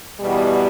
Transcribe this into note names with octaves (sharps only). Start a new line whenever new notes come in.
E2 B2 G3